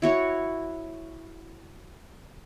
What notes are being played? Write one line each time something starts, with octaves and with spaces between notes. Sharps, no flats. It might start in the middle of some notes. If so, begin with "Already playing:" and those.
E4 F#4 C#5